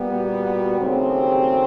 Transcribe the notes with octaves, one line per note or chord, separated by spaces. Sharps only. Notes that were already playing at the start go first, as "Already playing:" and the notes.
Already playing: A#2 G3 B3
F#4
D#2 C#3 F#3 A3 C4
G4